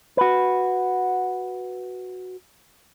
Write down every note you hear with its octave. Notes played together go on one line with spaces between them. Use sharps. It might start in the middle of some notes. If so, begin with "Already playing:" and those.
F#4 B4